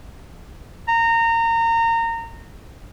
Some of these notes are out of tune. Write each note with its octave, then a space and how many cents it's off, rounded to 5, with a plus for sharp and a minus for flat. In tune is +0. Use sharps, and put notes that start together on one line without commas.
A#5 -25